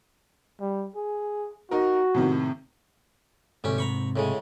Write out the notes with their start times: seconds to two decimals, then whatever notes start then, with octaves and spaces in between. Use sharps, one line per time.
0.60 G3
0.96 G#4
1.71 D#4 F#4 A#4
2.14 A2 C3 D#3
3.64 D2 G#2 C3 C#4 G4
3.78 A#5 B5 C#6
4.16 A2 C#3 G#3